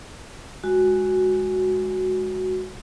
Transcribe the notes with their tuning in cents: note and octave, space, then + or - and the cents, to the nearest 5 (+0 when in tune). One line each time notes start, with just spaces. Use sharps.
G#3 +0 F#4 +0